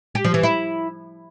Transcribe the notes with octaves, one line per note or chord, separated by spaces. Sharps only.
G4
F3
E3
E4